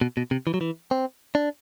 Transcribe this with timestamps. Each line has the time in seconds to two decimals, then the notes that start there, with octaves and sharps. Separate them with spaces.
0.01 B2
0.17 B2
0.31 C3
0.47 E3
0.54 F#3
0.61 E3
0.91 C4
1.35 D4